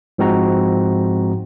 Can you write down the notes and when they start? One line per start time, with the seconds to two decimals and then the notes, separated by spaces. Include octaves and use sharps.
0.18 G#2 F3 G#3 C4 F#4 A#5